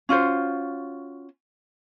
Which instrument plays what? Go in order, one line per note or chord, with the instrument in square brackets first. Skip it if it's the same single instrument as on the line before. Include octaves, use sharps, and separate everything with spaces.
[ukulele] C#4 F4 F#4 C5